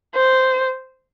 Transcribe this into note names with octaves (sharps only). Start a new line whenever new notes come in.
C5